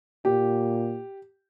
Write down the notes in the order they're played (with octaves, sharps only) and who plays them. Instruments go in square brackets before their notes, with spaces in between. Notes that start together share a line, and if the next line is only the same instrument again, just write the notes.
[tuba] A#2 [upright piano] G4